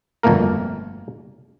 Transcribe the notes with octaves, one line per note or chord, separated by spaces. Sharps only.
G1 F2 B2 A3 A#3 A#4